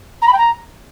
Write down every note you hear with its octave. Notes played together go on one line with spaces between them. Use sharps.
A#5
B5
G5
A#5